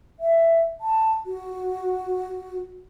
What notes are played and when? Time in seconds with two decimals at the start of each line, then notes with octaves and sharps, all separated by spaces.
0.20 E5
0.81 A5
1.26 F#4